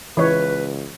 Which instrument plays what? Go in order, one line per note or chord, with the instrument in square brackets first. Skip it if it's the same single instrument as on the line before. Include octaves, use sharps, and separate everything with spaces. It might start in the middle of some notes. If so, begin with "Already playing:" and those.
[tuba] C#2 [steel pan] E3 C#5 [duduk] B4